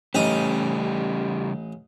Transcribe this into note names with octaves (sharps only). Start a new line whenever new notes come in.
A1 C#3 G3 D#4 G4 D#6